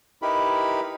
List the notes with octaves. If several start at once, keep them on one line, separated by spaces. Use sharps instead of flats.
D#4 E4 G4 A#4 B4 B5